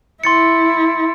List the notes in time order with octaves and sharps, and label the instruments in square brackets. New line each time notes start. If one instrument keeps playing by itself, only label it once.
[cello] E4 [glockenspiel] C6 A6 C#7